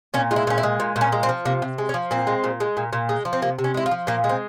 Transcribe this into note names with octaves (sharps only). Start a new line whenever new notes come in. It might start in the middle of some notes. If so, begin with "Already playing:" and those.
A#2 C#4
G#3 F4
E4
A#2 C#4
E4
G#3
A#2
A#2
C#4
G#3
C4
F3
C3 A#3
C3
G#3
C#4
F3
A#2 C4
G#3
A#2
G#3
A#2
A#2
G#3
F3
C4
C3 A#3
C3
C#4
G#3 E4
F4
F3
A#2 A#3
G#3
C4